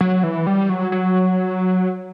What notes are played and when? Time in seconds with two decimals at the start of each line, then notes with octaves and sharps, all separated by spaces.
0.01 F#3
0.23 E3
0.47 G3
0.69 F#3
0.92 F#3